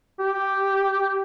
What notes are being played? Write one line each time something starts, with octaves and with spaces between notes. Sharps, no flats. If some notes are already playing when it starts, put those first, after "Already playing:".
G4